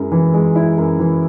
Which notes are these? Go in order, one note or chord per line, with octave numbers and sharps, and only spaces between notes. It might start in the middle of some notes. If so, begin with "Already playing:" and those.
Already playing: F#2 G#3 E4
E3
G#3
E4
F#2
E3